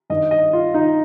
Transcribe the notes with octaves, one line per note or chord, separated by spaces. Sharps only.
G2 D#3 D#5
D#5
F4
D#4